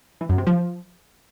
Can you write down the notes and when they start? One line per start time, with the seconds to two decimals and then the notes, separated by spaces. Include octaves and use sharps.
0.21 E3
0.29 F#2
0.38 C3
0.47 F3